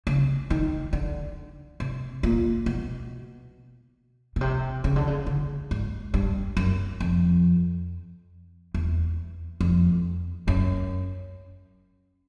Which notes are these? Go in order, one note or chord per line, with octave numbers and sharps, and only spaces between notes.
C#3
D#3
D3
C3
A#2
B2
B2
C3
C#3
D3
C#3
D3
G#2
G2
F#2
F2
E2
F2
F#2